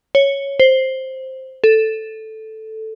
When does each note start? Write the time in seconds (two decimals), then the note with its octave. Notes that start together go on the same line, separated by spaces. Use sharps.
0.15 C#5
0.60 C5
1.64 A4